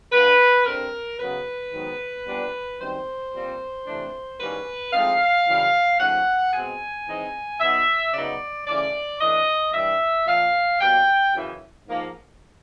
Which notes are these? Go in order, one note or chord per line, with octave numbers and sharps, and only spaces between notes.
D3 G3 A#3 B4
G2 D3 G3 C4 A#4
F#2 C#3 F#3 B3 B4
G#2 D#3 F#3 B3
A#2 G3 B3 D4
F#2 D#3 G3 C4 C5
A#2 G3 C4
C3 E3 A3 D4
G#2 E3 G3 A#3 C#4 B4
A2 F3 G#3 C4 D#4 F5
F#2 C#3 E3 G3
G#2 F3 A3 C#4 F#5
B2 G#3 C4 G#5
E3 G#3 C4 D#4
B2 F#3 B3 D#4 E5
C#3 F#3 B3 D#4 D5
C#3 E3 A3 C#4 D5
E3 A3 D4 D#5
G2 E3 G3 E5
A#2 F3 A#3 F5
B2 G3 A#3 G5
F#2 C#3 E3
G#2 F3 A#3